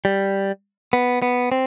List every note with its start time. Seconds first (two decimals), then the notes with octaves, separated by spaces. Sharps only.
0.05 G3
0.93 B3
1.22 B3
1.52 C4